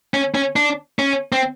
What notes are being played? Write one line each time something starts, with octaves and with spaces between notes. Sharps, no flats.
C#4
C#4
D4
C#4
C4